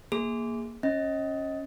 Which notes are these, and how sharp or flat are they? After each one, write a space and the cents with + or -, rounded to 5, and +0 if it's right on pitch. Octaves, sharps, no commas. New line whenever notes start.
A#3 +0 G#4 +0
C#4 -20 D#5 +15